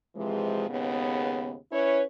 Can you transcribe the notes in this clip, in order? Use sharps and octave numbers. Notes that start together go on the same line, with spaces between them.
C3 E3 F3 G#3
D#2 G#2 C#3 B3
C#4 E4 B4 C#5